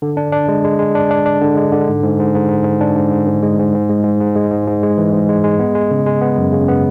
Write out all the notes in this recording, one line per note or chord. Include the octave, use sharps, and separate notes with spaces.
D3
D4
D4
G#3
G#3
G#3
D4
D4
D4
D3
G#3
D3
G#2
G#2
G#2
G#2
G#2
G#2
D4
G#2
G#2
G#2
G#3
G#2
G#2
G#3
G#2
G#2
G#3
G#2
G#2
G#3
E3
G#2
G#3
G#3
B3
G#3
C#3
G#3
B3
F#2
C#3
B3